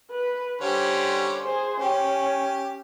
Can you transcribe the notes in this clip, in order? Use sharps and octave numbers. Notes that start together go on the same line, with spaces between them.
B4
D3 G3 C#4 C5
G#4 C5
C#4 G4